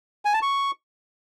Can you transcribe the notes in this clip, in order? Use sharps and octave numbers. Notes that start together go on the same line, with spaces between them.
G#5
A5
C#6